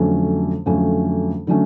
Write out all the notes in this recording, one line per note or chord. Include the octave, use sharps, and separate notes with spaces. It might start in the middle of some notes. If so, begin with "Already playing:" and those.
Already playing: F2 D3 F#3 A3 C#4
F2 D3 F#3 A3 C#4
D3 F#3 A3 C#4